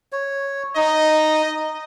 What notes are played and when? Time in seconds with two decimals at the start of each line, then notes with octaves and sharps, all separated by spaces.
0.12 C#5
0.76 D#4 D#5